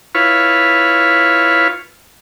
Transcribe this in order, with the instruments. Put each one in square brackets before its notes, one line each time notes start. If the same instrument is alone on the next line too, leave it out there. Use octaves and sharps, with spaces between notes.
[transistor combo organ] E4 F4 B4 C#5 F5